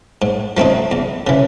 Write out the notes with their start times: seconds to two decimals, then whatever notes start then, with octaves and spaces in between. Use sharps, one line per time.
0.22 G#2
0.57 F3 A3 C4 D#4
0.91 E2
1.27 C#3 E3